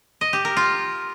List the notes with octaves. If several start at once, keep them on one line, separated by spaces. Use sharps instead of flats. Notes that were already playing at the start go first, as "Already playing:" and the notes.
D#5
G4
A#4
F4